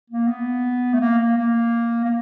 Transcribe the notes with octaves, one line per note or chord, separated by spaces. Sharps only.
A#3
B3
A3
A#3
A#3
A#3
A#3